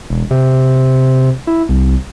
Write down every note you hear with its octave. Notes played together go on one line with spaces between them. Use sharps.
E1
C3
E4
C2